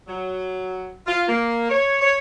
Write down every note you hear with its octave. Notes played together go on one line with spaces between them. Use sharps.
F#3
F4
A#3
C#5
C#5